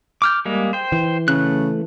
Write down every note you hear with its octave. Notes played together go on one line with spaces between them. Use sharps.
D6 F6 G6
G3 G#3 A#3
C5 G5
E3
C#3 A3 F#6